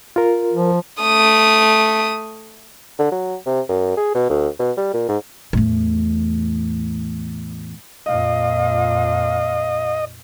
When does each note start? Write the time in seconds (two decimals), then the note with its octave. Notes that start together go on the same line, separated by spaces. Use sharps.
0.16 F4 A#4
0.53 F3
1.01 A3 D#6
2.99 D3
3.12 F#3
3.46 C3
3.69 F#2
3.97 G#4
4.15 B2
4.30 D2
4.59 B2
4.77 G3
4.94 A#2
5.09 G#2
5.53 E2 A2
8.06 F2 A#2 D#5 F5